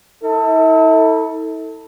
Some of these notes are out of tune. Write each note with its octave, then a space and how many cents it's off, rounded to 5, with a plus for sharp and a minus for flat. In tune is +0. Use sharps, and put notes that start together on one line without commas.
E4 -40 A4 +20